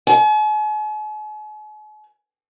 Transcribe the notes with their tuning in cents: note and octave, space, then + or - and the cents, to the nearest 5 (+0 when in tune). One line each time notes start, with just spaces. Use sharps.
G#5 +45